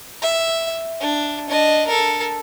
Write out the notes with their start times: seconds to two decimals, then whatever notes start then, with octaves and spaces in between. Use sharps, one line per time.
0.22 E5
1.01 D4
1.49 D4 D#5
1.87 A4 A#4